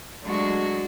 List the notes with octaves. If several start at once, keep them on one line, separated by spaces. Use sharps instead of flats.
F#3 G#3 A3 D4 F#4